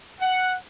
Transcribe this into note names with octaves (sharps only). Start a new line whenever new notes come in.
F#5